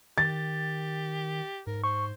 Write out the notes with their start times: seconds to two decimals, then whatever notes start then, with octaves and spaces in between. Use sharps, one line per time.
0.18 D#3 G4 A6
1.67 G#2 A#4
1.84 C5 C#6